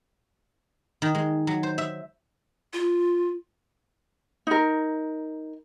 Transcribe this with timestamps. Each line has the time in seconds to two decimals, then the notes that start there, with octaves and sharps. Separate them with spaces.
1.02 D#3
1.15 G#3
1.47 F#3
1.63 C5
1.78 E5
2.73 F4
4.47 D#4 A#4